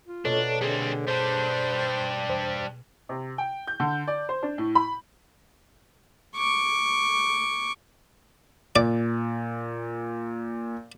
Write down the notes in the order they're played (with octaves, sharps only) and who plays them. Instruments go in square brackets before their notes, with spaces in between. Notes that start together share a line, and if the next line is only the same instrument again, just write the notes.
[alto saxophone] F4
[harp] B2 A#3 [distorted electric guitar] D4 [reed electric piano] A4 C#5 D#5
[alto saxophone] D3 [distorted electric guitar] G3 C4 [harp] G#4
[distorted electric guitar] G3 D4 [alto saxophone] C5
[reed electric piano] E2 C5
[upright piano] C3
G5
G6
D3
D5
C5
D4
A2
B5
[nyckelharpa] C#6 D6
[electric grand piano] A#2 [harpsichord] D5